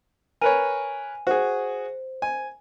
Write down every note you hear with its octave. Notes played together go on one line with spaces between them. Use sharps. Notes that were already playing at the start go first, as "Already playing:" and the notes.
A#4 B4 C#5 G#5 D#7
F#4 G#4 C5
G#5